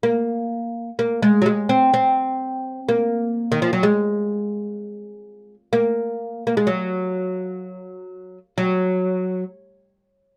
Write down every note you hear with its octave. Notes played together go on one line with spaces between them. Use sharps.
A#3
A#3
G#3
F#3
G#3
C4
C4
A#3
D#3
F3
F#3
G#3
A#3
A#3
G#3
F#3
F#3